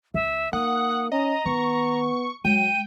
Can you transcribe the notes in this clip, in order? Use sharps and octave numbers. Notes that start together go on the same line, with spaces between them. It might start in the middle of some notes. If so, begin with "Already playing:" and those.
C#2 E5
A#3 D#4 F#5 D#6
C#4 D#5 A#5
D#3 B3 C#6
F#3 G#3 G5 D#7